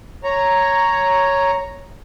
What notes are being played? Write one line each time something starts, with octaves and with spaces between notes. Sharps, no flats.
C#5 A#5